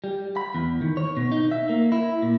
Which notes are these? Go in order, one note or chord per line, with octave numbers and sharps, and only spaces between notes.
G3
B5
E2
D#3
C#5
B2
D#4
E5
A#3
E4
A#2